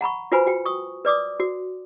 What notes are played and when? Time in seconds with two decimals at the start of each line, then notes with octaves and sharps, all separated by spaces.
0.01 F#5 A#5 B5 C#6
0.32 F4 F#4 B4 C5 G#5 B5
0.47 F#4 G5
0.66 C#6 D#6
1.05 B4 D5 D6 D#6
1.40 F#4